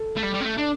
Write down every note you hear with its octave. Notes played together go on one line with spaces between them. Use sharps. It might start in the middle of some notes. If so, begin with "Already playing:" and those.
Already playing: A4
A3
G3
G3
C4
A3
D4